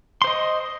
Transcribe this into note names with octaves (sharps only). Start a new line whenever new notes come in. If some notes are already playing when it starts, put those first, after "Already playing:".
C5 D#5 C6